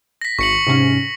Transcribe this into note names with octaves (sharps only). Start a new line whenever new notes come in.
A#6 B6
G#1 C#6 C#7 F#7
G#2 C3 C#4